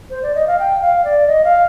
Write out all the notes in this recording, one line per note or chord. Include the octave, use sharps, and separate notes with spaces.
C5
D5
D#5
F5
G5
F5
D5
D#5
F5